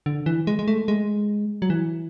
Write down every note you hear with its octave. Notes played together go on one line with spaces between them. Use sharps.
D3
E3
G#3
G#3
A3
G#3
F#3
E3